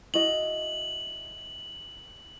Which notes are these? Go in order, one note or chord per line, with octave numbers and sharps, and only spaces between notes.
E4 F#4 D#5 F#7